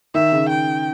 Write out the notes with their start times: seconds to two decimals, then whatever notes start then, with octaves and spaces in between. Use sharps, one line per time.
0.14 D#3 E5
0.32 C#3
0.49 G5